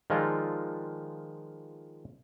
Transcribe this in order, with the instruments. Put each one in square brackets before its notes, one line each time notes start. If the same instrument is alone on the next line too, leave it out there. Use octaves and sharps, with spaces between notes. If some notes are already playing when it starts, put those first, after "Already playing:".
[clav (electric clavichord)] D#3 F3 G#3 F4 A4 D5